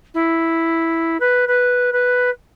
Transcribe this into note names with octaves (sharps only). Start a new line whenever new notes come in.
E4
B4
B4
B4